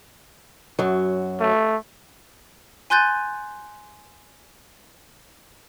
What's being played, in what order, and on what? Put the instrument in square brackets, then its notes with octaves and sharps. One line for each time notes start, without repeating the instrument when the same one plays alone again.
[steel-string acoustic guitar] F#2 F#3
[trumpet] A3
[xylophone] G#5 C6 F#6 G6 A6 D#7